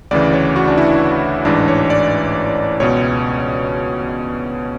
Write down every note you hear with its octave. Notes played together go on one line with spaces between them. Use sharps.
D2 C#3 E3 D5
C#5
F#4
D4
E4
A1 G#2 E3 D4
C#5
D5
C#2 B2 C#5